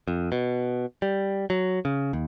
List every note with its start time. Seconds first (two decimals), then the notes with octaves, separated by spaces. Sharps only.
0.08 F2
0.32 B2
1.02 G3
1.50 F#3
1.85 C#3
2.13 D#2